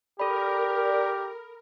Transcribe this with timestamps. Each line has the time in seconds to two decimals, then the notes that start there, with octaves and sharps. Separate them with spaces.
0.19 G4 A4 A#4 D5 B5